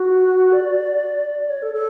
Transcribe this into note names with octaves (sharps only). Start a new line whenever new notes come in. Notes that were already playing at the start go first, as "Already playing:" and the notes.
Already playing: F#4
D5
C#5
A4
A4